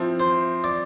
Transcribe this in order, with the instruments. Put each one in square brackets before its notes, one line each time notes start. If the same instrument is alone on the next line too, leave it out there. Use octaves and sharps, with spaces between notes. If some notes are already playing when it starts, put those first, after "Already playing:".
Already playing: [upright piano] F3 C4 E4
[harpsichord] C5
D5